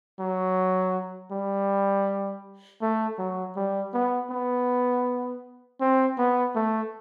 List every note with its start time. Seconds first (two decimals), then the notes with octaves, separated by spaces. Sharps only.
0.20 F#3
1.32 G3
2.82 A3
3.19 F#3
3.56 G3
3.94 B3
4.31 B3
5.81 C4
6.18 B3
6.56 A3